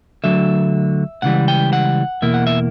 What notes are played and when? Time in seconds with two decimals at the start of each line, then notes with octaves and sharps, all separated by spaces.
0.24 D2 D3 F#3 E5
1.22 C#2 C#3 E3 G3 F#5
1.48 G5
1.73 F#5
2.22 E2 B2 A#3 E4 E5
2.34 F#5
2.47 E5